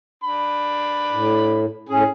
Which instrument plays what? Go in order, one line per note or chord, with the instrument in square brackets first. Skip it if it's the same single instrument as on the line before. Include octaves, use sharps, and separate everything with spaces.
[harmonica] D4 B5
[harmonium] A2
[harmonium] A2 C#4 [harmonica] G#4